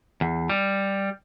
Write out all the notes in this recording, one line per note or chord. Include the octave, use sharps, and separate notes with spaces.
E2
G3